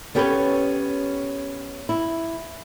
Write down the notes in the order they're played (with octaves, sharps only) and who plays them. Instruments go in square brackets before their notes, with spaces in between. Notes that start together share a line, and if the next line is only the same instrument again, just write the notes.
[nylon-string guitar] B3 C#4 G4 A4 B4 C#5
E4